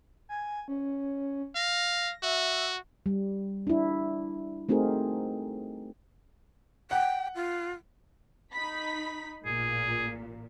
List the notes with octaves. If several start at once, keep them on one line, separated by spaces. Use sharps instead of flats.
G#5
C#4
F5 A#6
F#4 E5
G3
D4 E4
A3 C4 D#4 F#4 G#4 A#4
F#5 G5
F4
D#4 B5 B6
A1 A#2 G#4